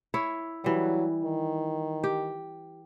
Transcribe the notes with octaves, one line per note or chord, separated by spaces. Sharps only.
E4 C#5
E3 F#3 G3
D#3
G4